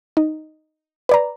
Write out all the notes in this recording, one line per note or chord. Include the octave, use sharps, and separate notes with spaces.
D#4
B4 D5 A#5